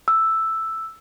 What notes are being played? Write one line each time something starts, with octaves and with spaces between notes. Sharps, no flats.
E6